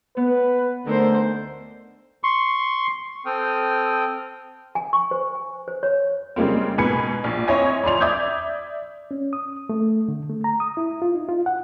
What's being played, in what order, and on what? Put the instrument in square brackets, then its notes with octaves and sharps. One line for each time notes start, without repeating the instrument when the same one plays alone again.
[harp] B3 [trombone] B4
[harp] D2 A3 D#4 [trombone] D3 [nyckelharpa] A#4 C5
[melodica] C6 C#6
[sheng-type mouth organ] C4 A4 G5 D#6 F6
[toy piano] G#5
C#6
C5
G#5
C5
C#5
[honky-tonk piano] C#3 G3 G#3 A#3 C4
G#2 B2 B4 G#5 C#7
A#1
C4 E4 C#5 D#5 G#5
F2 D5 C6 F7
D5 E5 D6 D#6 G6 G#6
[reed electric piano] C#4
D#6
A3
D3
A3
A#5
D#6
E4
F4
D#4
F4
F#5